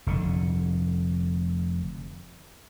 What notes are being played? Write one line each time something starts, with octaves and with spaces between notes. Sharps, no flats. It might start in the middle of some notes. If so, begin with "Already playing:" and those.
F1 D3